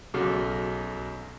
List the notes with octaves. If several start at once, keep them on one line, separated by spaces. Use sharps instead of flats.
B1 C#3 F#4 A4 D6